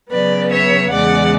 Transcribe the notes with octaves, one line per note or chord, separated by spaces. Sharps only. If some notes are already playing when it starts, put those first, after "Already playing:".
C#3 F#3 B3 B4 D5
C#5 E5
E2 C#3 G#3 D5 F#5